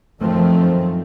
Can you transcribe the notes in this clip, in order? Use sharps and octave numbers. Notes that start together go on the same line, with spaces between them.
F#2 D#3 F3 A3 C4